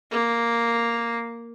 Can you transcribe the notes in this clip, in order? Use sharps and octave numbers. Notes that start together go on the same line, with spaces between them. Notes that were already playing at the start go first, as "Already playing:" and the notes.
A#3